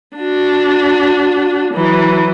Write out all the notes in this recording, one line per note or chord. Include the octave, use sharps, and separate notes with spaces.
D4 F#4
E3 F#3